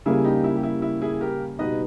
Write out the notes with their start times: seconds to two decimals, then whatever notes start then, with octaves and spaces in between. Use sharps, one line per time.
0.06 C#3 G3 A#3 E4 G#4
0.24 D#4 G4
0.44 E4
0.56 G4
0.63 E4
0.82 E4
1.02 E4 G#4
1.21 G4 A#4
1.59 B2 G3 B3 D#4 B4 D#5